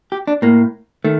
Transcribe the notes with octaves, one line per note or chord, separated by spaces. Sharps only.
G4
D4
A2 A#3
D#3 A3